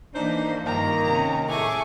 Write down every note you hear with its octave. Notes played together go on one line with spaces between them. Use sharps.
E3 A#3 D4 D#4 C5
G2 D#3 F3 A#3 A#5
C3 C#4
A2 A3 G#4 G#5 C#6 D6